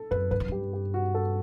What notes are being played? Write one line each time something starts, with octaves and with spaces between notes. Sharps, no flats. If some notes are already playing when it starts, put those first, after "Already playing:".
Already playing: A4
F#2 B4
G2 B4
F#2
G2 G4
G4
F#4
A4